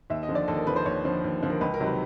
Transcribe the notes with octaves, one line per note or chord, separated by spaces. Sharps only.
D#2 E5
D#5
D3 F3
D5
D#2 A4
A#4
D3 F3 B4
C5
D#2 C#5
D3 F3
D#2
D3 F3
A#4
C#2 B4
A#4
C3 D#3 F#3
B4